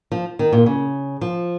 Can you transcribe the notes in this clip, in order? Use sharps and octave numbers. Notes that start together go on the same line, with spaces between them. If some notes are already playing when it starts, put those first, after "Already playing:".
F3
D#3
A#2
C#3
F3